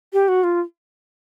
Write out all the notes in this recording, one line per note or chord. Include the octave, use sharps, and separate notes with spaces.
G4
F#4
F4